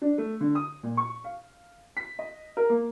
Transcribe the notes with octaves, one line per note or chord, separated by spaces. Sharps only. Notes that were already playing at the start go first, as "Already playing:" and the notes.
D4
A3
D3
D#6
A#2
C#6
F5
B6
D#5
A#4
A#3